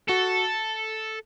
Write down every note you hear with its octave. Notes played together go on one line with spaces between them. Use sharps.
F#4 A4